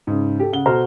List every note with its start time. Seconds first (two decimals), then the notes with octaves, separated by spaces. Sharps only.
0.07 G#2 C#3
0.40 G4 A4
0.53 C#3 F#5 G7
0.66 B2 F#4 A4 C5 A#5 F6